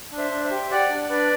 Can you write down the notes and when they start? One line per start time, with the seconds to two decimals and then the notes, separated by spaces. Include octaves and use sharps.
0.11 D4
0.18 C5 E5
0.31 D4
0.44 C5 E5
0.51 G4
0.70 G4 D5 F#5
0.90 D4
1.10 D4 B4 D5